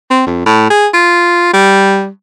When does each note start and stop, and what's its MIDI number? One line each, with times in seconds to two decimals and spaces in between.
0.10 0.22 60
0.27 0.43 41
0.46 0.69 45
0.70 0.87 68
0.94 1.50 65
1.53 2.08 55